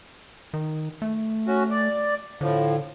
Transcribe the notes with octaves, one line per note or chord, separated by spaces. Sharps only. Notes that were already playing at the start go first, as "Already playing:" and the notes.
D#3
A3
C#4 F#4
D5
A2 D3 F3